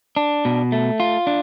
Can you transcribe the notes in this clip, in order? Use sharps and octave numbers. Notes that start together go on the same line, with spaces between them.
D4
B2
A3
F4
D4